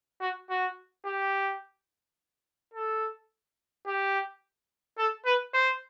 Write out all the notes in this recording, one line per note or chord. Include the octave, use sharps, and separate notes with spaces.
F#4
F#4
G4
A4
G4
A4
B4
C5